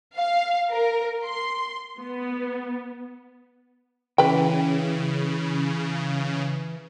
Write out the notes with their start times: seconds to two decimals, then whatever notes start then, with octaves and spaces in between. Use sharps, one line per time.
0.15 F5
0.71 A#4
1.24 C6
1.99 B3
4.18 C#3 E3 B4 G5